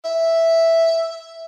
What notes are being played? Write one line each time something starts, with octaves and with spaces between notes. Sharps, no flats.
E5